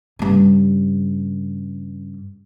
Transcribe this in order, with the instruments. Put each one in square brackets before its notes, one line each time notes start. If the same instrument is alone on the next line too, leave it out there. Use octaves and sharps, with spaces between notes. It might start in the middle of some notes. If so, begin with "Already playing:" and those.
[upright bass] G2 C#3